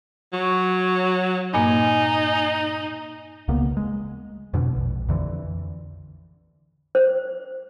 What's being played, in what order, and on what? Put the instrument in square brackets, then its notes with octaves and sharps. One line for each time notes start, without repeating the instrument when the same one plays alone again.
[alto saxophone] F#3 [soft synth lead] C#6
[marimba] G2 A#2 A#3 [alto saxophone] D#4 [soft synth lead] G#5
[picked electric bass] C#2 C#3 A#3 B3
G#3
F2 B2 D3
A#1
F2 D3 E3
[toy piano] C5